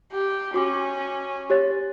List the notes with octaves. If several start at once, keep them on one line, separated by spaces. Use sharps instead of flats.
G4
C#4 F#4 D6
G4 C#5 A6